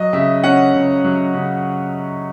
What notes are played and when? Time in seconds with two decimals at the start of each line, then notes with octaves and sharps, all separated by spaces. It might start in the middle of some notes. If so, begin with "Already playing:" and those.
Already playing: F#3 D#5
0.13 C#3 E5
0.44 C#4 F#5
0.74 C#3
1.04 F#3
1.35 C#3